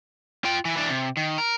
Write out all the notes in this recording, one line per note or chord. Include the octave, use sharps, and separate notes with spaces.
F4 G5
E3
E3 D4
C3
D#3
A#4